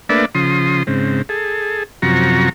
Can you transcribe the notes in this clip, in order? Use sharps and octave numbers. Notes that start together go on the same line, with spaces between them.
A3 A#3 D4 B4 D5 E5
C#3 F3 C6 D#6
G#2 C#3 C4
G#4 A4
F#2 C3 F3 F#4 A#5 C#6